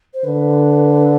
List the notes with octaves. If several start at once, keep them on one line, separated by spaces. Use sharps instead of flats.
C5
D3 B4